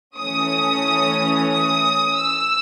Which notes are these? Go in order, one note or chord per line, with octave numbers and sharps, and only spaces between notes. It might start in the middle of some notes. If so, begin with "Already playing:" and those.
E3 A3 C#4 D#6
D#6
E6